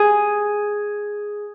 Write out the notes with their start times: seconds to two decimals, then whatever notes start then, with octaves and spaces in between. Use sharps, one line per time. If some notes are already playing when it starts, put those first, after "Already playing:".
Already playing: G#4